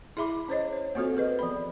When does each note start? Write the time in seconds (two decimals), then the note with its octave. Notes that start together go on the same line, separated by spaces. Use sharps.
0.17 E4 G#4 E5 B5 D6
0.48 C#4 C5 C#5 D#5
0.73 C5
0.95 A#3 C4 F4 F#4 A4 C5
1.17 G#4 B4 D#5
1.39 F3 B3 B5